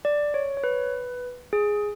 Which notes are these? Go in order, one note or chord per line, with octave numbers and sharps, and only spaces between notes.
D5
C#5
C#5
B4
G#4